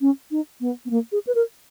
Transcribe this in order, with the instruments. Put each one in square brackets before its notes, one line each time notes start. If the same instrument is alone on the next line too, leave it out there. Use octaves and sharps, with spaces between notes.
[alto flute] C#4
D#4
B3
B3
A#3
G#4
B4
A#4